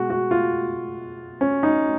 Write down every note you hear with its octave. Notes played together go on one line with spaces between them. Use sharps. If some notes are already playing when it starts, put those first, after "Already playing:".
Already playing: B2 G#3 F#4
F#4
F4
C#4
D#4